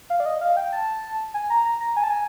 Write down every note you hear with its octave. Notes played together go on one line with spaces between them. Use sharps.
F5
D5
D#5
F5
G5
A5
G#5
A#5
A#5
A#5
G#5
A5
G#5